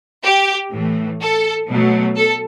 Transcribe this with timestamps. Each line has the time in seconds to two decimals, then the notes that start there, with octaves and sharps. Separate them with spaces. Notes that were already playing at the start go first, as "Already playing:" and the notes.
0.24 G4
0.72 A2 E3 A3
1.21 A4
1.69 B2 F#3 A3
2.17 A4